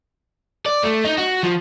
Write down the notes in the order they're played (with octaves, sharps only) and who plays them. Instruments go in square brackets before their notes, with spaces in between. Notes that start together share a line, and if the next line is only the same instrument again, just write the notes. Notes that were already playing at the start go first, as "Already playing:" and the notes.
[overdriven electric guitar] D5
A3
D#4
F#4
F3